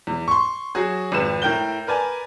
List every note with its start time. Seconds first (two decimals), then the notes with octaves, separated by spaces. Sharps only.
0.07 E2
0.28 C6 C#6
0.75 F#3 F#4 G#4
1.12 G#1 F2 B4 E7
1.42 A2 A#4 G5 G6 G7
1.87 A#4 B4 D5 G#5 A5